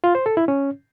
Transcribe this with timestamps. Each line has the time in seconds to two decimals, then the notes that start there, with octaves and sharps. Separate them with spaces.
0.04 F4
0.15 C5
0.26 A4
0.37 E4
0.48 C#4